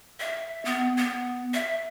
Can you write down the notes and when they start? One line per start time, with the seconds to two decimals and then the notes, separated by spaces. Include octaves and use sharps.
0.20 E5
0.65 B3
0.98 B3
1.54 E5